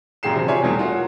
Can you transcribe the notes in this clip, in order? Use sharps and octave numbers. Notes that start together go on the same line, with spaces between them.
F#2 A#2 G4 G#4 C7 E7
C3 F3 F#3
F4 C#5 D5 E5 G#5
E2 B2 E3 F#3 G3 A3
F4 F#4 A#4 C#5